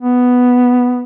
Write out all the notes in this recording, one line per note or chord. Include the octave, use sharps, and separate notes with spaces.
B3